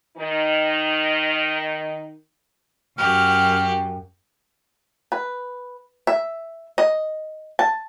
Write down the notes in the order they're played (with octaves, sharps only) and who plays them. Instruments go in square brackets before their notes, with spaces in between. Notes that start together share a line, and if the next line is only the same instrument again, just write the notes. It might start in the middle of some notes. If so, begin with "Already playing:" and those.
[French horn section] D#3 D#4
[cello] F#2 [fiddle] F#4 G4 [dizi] F6
[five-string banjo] B4
E5
D#5
A5